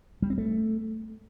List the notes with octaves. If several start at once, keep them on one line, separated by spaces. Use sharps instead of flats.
G3
C4
A3